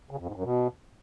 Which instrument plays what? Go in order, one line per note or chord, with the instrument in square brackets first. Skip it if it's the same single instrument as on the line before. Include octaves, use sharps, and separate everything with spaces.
[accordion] C#3
F2
G#2
F#2
B2